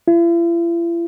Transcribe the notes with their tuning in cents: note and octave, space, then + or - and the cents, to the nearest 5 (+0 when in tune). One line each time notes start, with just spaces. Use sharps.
E4 +45